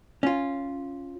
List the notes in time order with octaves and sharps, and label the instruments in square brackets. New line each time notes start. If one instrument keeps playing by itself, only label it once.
[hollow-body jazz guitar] C#4 F4